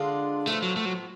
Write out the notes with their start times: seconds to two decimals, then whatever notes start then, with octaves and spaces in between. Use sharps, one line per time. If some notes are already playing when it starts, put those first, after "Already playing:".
Already playing: D3 G#3 D4 F4
0.47 A2 F3 A3 B3
0.62 F#3
0.76 A3
0.85 F#3